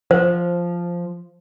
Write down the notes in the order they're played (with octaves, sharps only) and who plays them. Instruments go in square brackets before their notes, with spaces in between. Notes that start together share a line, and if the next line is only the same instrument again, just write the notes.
[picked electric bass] F3 [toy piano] C5